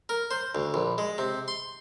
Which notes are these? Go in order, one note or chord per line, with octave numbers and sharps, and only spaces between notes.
A#4
C5
D2
A#1
G#3
C3
C6